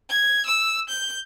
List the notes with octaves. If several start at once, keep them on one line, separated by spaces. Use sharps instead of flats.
G#6
E6
G6